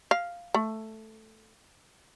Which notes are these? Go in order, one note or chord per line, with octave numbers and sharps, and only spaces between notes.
F5
A3